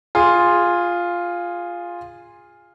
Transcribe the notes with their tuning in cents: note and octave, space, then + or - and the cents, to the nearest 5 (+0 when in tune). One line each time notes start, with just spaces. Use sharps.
F4 +0 G#4 -15